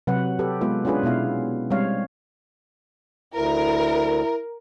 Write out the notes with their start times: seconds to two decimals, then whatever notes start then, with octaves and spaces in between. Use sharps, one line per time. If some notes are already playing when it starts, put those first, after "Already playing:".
0.07 C3 F#3 B4 F#5
0.39 G4 A4 B4
0.61 G#3 B3 F4 B4
0.85 C#4 D4 F4 G#4 B4
1.03 B2 B3 E4 F5
1.71 G3 G#3 C4 C#5 F5
3.35 D2 E4 A#4